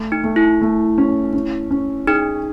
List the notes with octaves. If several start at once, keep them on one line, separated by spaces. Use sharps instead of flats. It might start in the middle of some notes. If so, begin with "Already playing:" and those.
Already playing: A3
D#4
A3
E4
A3
C#4
C#4
C#4
D#4 G#4